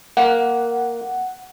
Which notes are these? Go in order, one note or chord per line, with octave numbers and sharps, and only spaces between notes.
A#3 F#5